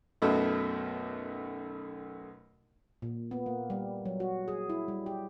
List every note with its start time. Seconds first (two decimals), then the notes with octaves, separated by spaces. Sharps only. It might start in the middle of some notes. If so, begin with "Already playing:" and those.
0.22 B1 F#2 B2 A3
3.02 A#2
3.31 B3
3.46 A#3
3.70 G3
4.06 F#3
4.20 F#4
4.48 G#4
4.70 E4
4.88 G3
5.06 G4